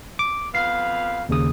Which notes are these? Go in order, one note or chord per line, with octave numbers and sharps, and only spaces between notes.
D6
F2 B3 F5 C7
D#2 C#3 D#6